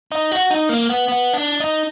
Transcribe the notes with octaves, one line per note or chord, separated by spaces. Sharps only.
D#4
F#4
D#4
A#3
B3
B3
D4
D#4